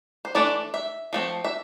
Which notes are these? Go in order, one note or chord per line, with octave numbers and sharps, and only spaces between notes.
C5
E3 A3 D4 D5
E5
F3 A3 C4
E5